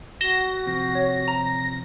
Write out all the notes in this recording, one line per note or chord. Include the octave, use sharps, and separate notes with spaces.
F#4 A#6 E7 G7
C3 F3 C4
C#5
A#5